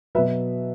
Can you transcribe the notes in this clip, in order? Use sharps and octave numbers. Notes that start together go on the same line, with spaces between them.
B2 F#3 B4 E5